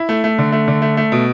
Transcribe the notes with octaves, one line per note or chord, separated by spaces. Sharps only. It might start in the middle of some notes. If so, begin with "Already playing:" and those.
Already playing: E4
A3
A3
D3
A3
D3
A3
A3
B2